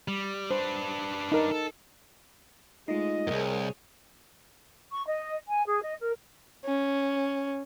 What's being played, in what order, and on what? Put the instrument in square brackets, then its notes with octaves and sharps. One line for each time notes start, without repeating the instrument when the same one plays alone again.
[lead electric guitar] G3
[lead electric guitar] D4 B4 [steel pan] C5
[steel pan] D#4 A#4
[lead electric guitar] A4
[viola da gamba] G#3 A3 [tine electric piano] D#4 F4 [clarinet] D#5
[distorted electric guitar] C2 F#2 [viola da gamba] G#4 C#5 [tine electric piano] A#4
[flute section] C#6
D#5
G#5
G#4
D#5
A#4
[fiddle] C#4